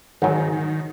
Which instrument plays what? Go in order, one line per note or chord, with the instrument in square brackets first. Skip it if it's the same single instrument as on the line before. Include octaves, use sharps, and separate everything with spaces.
[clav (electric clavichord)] G#1 G#2 F#3 [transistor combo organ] D#3
[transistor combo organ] D#3